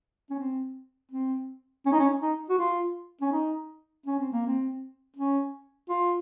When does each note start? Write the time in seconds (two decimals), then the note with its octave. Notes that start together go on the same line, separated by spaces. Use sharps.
0.30 C#4
0.39 C4
1.11 C4
1.86 C#4
1.92 D#4
1.99 C#4
2.22 D#4
2.49 F#4
2.58 F4
3.21 C#4
3.32 D#4
4.06 C#4
4.20 C4
4.32 A#3
4.47 C4
5.16 C#4
5.90 F4